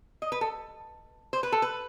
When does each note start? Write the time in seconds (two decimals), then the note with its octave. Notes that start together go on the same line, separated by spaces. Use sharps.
0.22 D#5
0.32 B4
0.41 A4
1.33 C5
1.43 B4
1.52 A4
1.62 B4